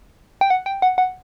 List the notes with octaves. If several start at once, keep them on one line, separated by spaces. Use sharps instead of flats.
G5
F#5
G5
F#5
F#5